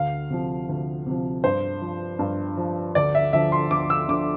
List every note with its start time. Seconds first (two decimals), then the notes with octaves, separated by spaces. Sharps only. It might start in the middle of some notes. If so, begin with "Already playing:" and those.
Already playing: D2 F5
0.30 C3 F3
0.69 D2
1.07 C3 F3
1.44 G2 C5
1.82 F3
2.19 G2
2.57 F3
2.95 D2 D5
3.15 E5
3.33 D3 F3 E5
3.52 C6
3.71 D2 D6
3.90 E6
4.08 D3 F3 D6